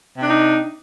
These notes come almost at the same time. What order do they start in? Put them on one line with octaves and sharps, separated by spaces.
C3 D4 D#4